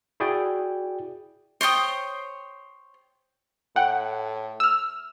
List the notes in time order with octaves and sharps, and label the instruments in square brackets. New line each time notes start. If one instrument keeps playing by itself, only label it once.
[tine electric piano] E4 F#4 G#4 D5 G5
[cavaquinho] C5 C#5 G5 D#6
[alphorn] A2 [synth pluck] F#5 G5
[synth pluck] E6 F6